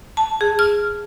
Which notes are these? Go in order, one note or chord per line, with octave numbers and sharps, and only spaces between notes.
A5
G#4
F6